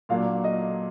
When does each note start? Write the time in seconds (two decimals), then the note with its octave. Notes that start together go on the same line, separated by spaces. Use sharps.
0.09 A#2 F#3 A#3 D4 F5
0.44 D#5